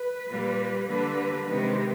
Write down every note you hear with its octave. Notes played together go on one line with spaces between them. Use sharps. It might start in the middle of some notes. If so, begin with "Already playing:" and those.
Already playing: B4
A#2 G3 A#3
D3 G3 A#3 B4
C3 D#3 G#3 B4